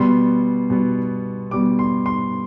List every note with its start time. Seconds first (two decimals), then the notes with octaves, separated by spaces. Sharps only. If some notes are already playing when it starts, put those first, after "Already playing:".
Already playing: B2 G3 B3 C6
0.70 B2 G3 B3
1.51 B2 G3 B3 D6
1.79 C6
2.06 C6